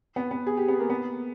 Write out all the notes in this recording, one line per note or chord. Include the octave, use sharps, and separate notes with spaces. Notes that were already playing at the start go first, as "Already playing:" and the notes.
B3
B3
G#4
G4
B3
A#3
B3